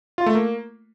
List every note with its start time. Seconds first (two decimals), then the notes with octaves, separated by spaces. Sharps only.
0.18 F4
0.26 A3
0.35 A#3